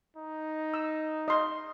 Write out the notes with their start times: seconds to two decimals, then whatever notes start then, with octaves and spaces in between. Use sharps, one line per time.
0.17 D#4
0.74 E6
1.28 D#5 C6